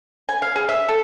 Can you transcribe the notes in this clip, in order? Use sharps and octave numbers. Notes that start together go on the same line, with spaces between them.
G#5
F5
G#4
E5
A4